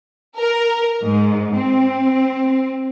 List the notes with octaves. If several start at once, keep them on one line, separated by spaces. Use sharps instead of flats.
A#4
G#2
C4